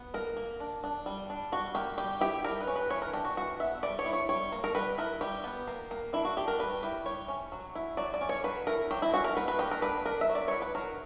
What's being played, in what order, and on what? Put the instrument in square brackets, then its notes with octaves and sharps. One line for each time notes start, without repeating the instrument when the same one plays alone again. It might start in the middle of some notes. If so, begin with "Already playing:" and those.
Already playing: [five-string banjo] B3
A#3 A#4
A#3
D4
D4
G3
D4
G3 F#4
A#3 G4
G3 G4
E4 G4
G3 A#4
B4
C#4
B4
E3 C#5
A#4
D4 G4
F#4
E3 F#4
B3 E5
G3 D5
C#5
E4
C#5
G3 C#5
A#3
A#4
G3 B4
E4 A#4
G3 G4
B3
A#3
A#3
D4 E4
F#4
D4 G4
A#4
G3 B4
E4 G4
G3 C#5
C#4
F#3
E4
F#3 D5
D5
C#4
C#5
F#3 B4
E4 A#4
F#3 G4
E4
C#4 F#4
A#4
A#3 B4
B4
A#3 G4
A#4
D4 B4
D4 A#4
E5
F#3
D5
E4 C#5
B4
F#3 A#4